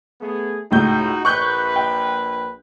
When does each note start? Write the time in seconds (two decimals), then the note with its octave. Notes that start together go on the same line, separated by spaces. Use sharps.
0.20 A3 B3 G#4
0.71 C#2 A2 D#4 F#4 G6
1.25 A#1 B4 C#6 F#6 G6
1.76 G5